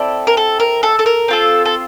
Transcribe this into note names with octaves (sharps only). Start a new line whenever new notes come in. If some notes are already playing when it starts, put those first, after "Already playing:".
Already playing: C4 E4 A4 D5
A#4
A4
A#4
A4
A4
A#4
C4 F4 A4
A4